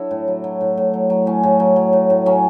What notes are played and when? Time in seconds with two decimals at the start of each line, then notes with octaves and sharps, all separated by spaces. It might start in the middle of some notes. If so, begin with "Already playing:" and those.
Already playing: F#3 D4 E4 F#4 A4
0.11 A2
0.28 F#3
0.44 F#3
0.61 A2
0.77 A2
0.94 F#3
1.10 F#3
1.26 A2 C#4
1.43 A2
1.60 F#3
1.76 F#3
1.93 A2
2.10 A2
2.26 F#3 C#4